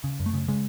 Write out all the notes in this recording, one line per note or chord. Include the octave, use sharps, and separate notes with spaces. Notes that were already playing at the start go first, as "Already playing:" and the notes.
C#3
F#2
A3
C#3
C#3 G#3